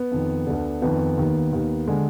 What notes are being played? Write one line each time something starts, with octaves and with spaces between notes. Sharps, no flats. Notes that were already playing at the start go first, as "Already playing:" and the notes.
Already playing: B3
F2 D#3
D2 D3
F2 D#3 B3
D#2 D#3
D#2 D#3
D3 G#3